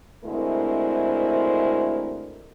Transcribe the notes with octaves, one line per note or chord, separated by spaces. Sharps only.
D2 G#3 C4 E4 A#4